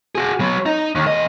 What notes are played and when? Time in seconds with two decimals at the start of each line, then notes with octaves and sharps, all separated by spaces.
0.15 F#4 G#4
0.40 F#3 B3
0.66 D#4
0.95 D#2
1.07 E2 D#5